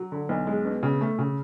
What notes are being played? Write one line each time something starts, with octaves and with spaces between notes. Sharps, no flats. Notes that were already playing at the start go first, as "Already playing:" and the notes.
Already playing: F#3
D3
B1
G#3
B2
C#3
A3
C#3